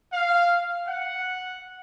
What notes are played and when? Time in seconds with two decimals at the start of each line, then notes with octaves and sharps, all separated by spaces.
0.12 F5
0.87 F#5